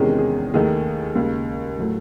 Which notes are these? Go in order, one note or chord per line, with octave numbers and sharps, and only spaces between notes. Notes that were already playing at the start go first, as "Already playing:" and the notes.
Already playing: E2 C3 D#3 G#3 C#4 G#4
G#4
D#2 D#3 A3 G#4
D#2 C#3 G#3
A2 F#3 A3